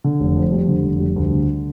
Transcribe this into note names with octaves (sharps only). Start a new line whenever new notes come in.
D3
F1
F2
G3
D3
F1
G3
D2
D3